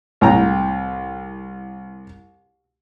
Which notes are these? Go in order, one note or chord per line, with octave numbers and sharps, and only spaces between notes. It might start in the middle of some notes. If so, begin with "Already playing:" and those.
C2 A2 G5 A#5